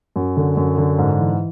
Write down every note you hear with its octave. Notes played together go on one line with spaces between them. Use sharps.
F#2
D3
F#2
D3
G#2
E3